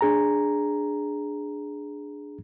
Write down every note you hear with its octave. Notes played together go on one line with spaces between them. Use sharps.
D4 G#4 A#5